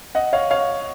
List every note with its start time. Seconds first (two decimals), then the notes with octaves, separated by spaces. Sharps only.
0.15 D#5 F#5
0.33 C#5 F5
0.51 C#5 F5